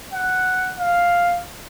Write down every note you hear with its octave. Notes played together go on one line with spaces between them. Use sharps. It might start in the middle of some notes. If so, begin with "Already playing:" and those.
F#5
F5